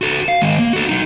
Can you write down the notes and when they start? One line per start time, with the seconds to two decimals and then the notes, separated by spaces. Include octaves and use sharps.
0.02 F#4 A4
0.28 F5
0.42 D#3 G#3
0.59 A#3
0.73 F#4 A4
0.89 F#3 D#4